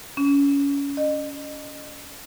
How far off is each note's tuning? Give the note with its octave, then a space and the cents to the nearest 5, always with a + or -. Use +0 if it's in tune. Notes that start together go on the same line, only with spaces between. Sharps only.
C#4 +25
D#5 -30